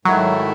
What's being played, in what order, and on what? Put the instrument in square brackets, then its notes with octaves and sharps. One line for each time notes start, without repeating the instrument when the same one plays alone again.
[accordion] G#2 D#3 A3 E4 [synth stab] F#3